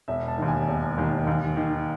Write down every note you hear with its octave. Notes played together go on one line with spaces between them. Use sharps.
E1 E5
A5
D#2 D#3
G#5
E1
D#2 D#3
D#2
D#3